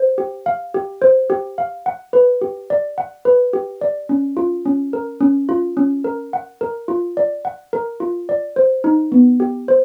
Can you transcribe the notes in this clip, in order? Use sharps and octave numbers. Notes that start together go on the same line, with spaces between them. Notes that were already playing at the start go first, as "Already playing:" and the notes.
Already playing: C5
G4
F5
G4
C5
G4
F5
F#5
B4
G4
D5
F#5
B4
G4
D5
C#4
F4
C#4
A#4
C#4
F4
C#4
A#4
F#5
A#4
F4
D5
F#5
A#4
F4
D5
C5
D#4
B3
G4
C5